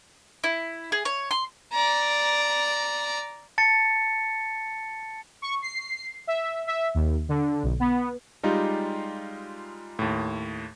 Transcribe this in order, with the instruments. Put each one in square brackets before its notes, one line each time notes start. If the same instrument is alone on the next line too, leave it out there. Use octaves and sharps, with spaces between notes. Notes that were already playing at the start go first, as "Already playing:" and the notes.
[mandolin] E4
G#4
C#5
C6
[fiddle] D5 A#5
[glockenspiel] A5 A6 C#7
[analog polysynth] C#6
C7
E5
E5
D#2
D3
B1
B3
[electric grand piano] G3 G#3 D#4 F4 G4
D#2 A2